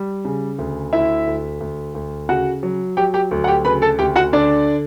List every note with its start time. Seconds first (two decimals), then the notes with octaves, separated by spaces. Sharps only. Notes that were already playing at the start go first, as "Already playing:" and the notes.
Already playing: G3
0.25 C#3
0.58 D2
0.93 D2 E4 E5
1.27 D2
1.60 D2
1.95 D2
2.29 C#3 F#4 F#5
2.63 F#3
2.97 F#3 G4 G5
3.14 G4 G5
3.31 D2
3.44 F#5
3.48 G4 G5
3.65 C#3 B4 B5
3.82 A4 A5
3.99 D2 G4 G5
4.16 F#4 F#5
4.33 D3 D4 D5